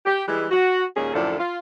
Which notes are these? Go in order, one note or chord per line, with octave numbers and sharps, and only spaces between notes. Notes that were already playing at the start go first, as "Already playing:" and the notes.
G4
E3 G3 G#3
F#4
D#2 A#2 C#4 G#4
F#2 A2 D3 F3 A4 D5
F4